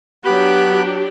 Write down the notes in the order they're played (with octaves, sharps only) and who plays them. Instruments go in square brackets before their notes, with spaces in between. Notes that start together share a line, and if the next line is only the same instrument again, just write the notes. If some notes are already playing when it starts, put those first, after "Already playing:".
[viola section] F#3 D4 G4 [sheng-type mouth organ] B3 B5 F#6